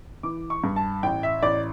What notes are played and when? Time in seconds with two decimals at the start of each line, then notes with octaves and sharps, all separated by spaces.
0.23 E3 D6
0.50 C#6
0.64 G2
0.76 A5
1.03 A1 G5
1.23 E5
1.43 A1 D5